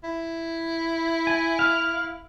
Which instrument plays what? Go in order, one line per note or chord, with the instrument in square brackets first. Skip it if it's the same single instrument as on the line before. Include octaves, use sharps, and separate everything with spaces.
[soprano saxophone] E4
[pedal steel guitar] G#5
F5